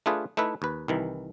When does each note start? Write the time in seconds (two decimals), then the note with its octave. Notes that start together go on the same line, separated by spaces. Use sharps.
0.06 A3 D4 F4 G#4 B4
0.37 A3 D#4 E4 B4
0.62 D#2 B4
0.88 C2 D#3 E3